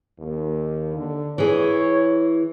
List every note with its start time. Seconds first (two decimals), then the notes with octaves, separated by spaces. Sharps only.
0.19 D#2
0.96 D3
1.38 E3 G#4 C#5